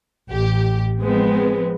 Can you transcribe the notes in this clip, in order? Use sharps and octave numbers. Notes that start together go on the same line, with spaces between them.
A1 G4
F3 G#3 B3 C4